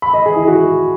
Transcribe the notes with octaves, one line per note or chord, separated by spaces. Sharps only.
B5
D#5
G#4
E4
F#4